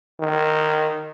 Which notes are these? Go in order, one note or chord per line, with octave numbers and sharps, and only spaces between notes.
D#3